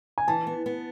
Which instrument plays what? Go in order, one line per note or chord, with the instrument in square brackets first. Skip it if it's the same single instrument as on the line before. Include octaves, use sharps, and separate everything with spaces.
[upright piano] G#5
[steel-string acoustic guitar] E3 [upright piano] A5
[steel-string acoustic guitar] B3
B3